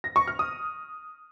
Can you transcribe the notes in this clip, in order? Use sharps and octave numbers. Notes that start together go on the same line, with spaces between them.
A#6
C#6
F6
D#6